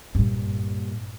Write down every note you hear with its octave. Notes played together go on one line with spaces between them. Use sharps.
G2 A#2